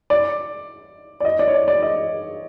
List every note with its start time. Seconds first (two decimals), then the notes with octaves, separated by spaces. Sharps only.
0.10 D5
1.20 D5
1.25 D#5
1.39 D5
1.48 C#5
1.54 D5
1.68 D5
1.83 D#5